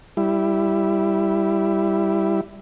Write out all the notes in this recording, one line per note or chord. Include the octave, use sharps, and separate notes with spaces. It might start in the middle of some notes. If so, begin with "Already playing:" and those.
G3 E4